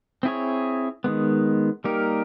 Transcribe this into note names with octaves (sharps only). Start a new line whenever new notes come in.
C4 E4 G#4 C#5
D#3 G#3 B3
G3 A#3 D#4 G4 A#4